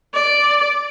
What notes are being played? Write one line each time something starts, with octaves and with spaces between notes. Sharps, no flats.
D5